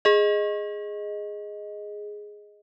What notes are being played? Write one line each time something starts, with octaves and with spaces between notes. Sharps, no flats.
G#4 D#5